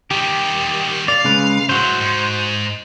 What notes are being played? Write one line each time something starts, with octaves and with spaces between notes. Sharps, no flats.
D#3 G3 G4
D5 F5
C#3 G#3 B4
A2 F#3 F#4 C5
G#2